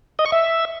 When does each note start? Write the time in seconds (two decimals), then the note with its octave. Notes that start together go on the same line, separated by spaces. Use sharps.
0.19 D#5
0.26 C#6
0.32 E5